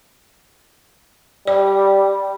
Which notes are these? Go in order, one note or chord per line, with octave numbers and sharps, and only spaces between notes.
G3 D5